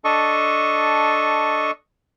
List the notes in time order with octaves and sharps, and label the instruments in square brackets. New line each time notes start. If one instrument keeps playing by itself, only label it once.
[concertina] D4 A4 D#5 C#6